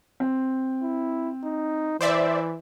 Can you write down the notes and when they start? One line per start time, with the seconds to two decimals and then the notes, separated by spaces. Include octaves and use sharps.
0.20 C4
0.82 E4
1.44 D#4
2.01 E3 C5 D5 E5